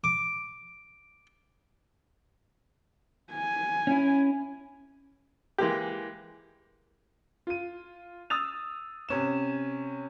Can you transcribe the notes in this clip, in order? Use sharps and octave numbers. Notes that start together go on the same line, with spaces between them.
D6
G#5
C#4 E4
E3 G#3 A#3 G4
F4 D#7
D#6 E6 A6 F7
C3 C#4 E7